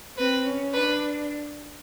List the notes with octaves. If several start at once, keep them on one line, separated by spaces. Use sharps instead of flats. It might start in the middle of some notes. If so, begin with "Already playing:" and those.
C4 B4
C#4
D4 B4